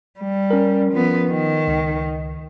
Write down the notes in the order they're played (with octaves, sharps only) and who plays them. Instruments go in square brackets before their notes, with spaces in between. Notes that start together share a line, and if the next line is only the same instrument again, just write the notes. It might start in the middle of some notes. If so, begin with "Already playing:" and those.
[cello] G3
[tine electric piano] C#4 A#4
[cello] F3 B3
D#3
[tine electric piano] C#2